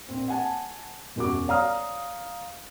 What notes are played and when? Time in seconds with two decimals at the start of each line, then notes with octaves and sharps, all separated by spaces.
0.08 A#1 C4
0.28 F#5 G#5 A5
1.16 E1 F#2 F#4 D6
1.48 C#5 D5 F5 A#5 D#6 F6